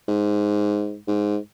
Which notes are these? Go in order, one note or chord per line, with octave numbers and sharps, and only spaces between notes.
G#2
G#2